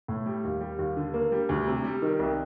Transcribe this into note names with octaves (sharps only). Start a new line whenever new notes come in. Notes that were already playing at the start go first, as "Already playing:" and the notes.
A2
G3
D#2
G3
D#2
D3
A#3
G3
D2
C3
G3
D#3
C2